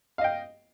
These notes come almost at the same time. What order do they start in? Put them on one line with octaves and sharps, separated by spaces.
F5 D#5 G5